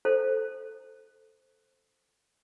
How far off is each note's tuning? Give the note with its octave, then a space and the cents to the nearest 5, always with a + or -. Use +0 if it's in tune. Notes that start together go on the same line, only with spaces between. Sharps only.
A4 +0 C5 +0